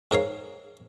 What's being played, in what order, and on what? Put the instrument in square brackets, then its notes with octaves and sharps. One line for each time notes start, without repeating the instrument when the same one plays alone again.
[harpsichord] G#2 A#4 C#5 F5